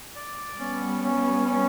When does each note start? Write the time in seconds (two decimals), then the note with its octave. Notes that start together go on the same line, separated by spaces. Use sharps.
0.16 D5
0.59 G3 B3 C#4
1.04 C#4
1.47 C#4